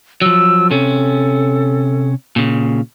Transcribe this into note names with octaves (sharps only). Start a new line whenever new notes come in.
F3 F#3 E6
C3 C#4 A4
A#2 C#3